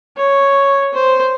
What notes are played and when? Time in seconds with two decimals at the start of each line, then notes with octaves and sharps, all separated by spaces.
0.17 C#5
0.94 C5